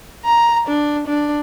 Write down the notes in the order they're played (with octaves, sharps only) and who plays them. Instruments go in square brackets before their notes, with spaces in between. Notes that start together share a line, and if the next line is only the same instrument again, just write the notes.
[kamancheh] A#5
D4
D4